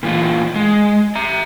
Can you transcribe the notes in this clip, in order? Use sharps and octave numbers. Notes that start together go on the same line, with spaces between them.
A#2 E3 F4
G#3
E5 A#5